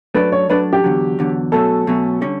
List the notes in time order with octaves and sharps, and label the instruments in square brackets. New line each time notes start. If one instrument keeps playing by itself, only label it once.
[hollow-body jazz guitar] F#3 A3 D4 A4 D5 [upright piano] B4
[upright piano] C#5
[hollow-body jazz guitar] F#3 A3 D4 A4 D5 [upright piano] B4
[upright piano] G4
[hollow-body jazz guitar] E2 D3 F#3
E2 D3 F#3
[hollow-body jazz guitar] B2 F#3 A3 C#4 [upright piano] A4
[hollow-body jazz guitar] B2 F#3 A3 C#4
D3 G3 C#4